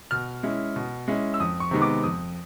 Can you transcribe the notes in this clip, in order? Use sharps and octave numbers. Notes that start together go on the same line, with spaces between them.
B2 F6
G#3 C#4 E4
B2
G#3 C#4 E4
E6
F2 D#6
C#6
C3 D#3 G#3 B3
D6
F2 D#6